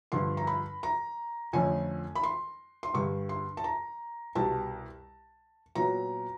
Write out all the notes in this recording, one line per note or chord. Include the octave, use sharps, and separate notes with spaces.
G2 D3 F3 C6
A#5
B5
A#5
F2 D3 F3 A3 C#4 G#5
B5
C6
C6
G2 D3 G3 C#6
C6
A5
A#5
C2 B2 G3 A5
A#2 F#3 B3 A#5